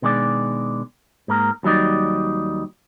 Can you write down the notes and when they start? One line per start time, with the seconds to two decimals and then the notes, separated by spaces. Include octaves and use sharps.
0.02 B2 D#3 G#3 D4 D5
1.28 G#2 A#3 A#4
1.63 D#2 F#3 G3 D#4 D5